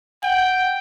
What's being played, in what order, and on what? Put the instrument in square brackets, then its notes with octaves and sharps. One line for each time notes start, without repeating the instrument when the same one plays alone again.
[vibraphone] F#5 [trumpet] G5